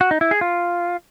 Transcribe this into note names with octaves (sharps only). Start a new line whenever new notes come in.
F#4
D#4
E4
G#4
F4